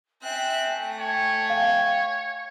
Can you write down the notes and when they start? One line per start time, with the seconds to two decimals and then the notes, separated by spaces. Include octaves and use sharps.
0.23 C4 E5 G5 G#5 F#6
0.68 A3
0.99 C#5 G5 G#5
1.50 F5